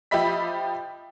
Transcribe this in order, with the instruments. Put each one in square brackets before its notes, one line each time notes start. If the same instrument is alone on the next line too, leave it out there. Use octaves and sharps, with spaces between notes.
[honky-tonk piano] F3 G4 D#5 E5 B5 B6